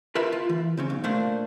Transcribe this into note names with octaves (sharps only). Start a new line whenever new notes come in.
F4 A#4 B4 E5 B5
F4
E3
C#3 C4 C#4
B1
A#2 A3 A#3 D4 C5